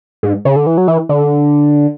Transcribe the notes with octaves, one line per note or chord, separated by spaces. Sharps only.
G#2
C#3
D3
E3
F#3
E3
D3